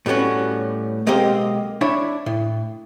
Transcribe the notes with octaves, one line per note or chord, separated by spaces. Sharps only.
A2 G3 B3 C#4 F#4
B1 G#3 A#3 C4 G4 D#5
D4 E4 C#5
A2